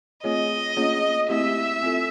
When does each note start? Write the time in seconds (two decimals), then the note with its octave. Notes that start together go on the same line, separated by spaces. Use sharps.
0.24 A3 C4 F4 G#4 C#5 D#5
0.77 A#3 C#4 F4 G#4 C#5
1.29 A3 C4 E4 G4 E5
1.83 C4 F4 A4